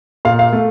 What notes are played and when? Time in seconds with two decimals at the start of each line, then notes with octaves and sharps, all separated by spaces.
0.25 A#2 F5
0.39 F5
0.53 A3